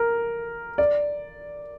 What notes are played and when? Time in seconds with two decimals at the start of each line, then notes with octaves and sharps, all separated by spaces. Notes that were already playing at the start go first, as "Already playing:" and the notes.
Already playing: A#4
0.78 D5